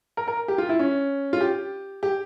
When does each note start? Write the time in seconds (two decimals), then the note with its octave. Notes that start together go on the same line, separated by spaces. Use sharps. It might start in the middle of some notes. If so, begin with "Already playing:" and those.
0.17 A#4
0.28 A#4
0.48 G4
0.58 F4
0.69 E4
0.79 C#4
1.33 F4
1.41 G4
2.03 G4